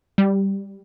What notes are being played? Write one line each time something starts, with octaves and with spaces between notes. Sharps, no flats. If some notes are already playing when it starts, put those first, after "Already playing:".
G3